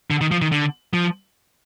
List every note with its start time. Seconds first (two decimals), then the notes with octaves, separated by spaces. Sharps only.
0.10 D3
0.21 D#3
0.31 F3
0.42 D#3
0.52 D3
0.94 F3